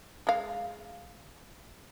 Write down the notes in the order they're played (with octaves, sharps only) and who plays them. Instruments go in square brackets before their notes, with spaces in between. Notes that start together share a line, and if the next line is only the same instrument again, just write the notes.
[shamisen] G#3 F5